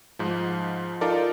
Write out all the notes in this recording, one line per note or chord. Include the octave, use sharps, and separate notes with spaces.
G#2 F3
D#4 F4 A4 A#4 D5